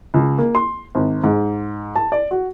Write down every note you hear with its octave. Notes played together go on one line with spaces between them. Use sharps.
C#2
A#3
C6
G#1
G#2
A5
D5
F#4